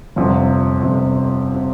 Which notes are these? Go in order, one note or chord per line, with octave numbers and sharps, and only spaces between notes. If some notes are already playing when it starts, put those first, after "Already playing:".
G1 F2 C3
G1 F2 C3
C3